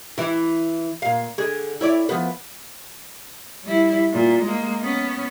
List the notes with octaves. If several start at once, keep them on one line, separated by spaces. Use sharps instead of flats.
E3 E4
A#2 F5
D3 G#4
E4 C#5 D5
F3 B3 B4
G3 E4
A#2
G#3 A#3
B3 C#4